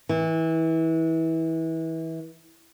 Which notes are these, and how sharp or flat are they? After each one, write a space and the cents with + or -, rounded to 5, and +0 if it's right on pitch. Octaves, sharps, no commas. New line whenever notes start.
E3 -25